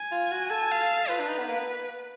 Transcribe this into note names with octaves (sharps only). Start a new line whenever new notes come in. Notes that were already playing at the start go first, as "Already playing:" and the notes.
Already playing: G#5
F4
F#4
A4
F5
F4 B4
D4
D#4
B3
A#3
B3